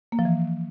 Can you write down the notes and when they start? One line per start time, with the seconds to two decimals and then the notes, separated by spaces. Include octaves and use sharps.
0.12 A#3
0.19 F3
0.25 E3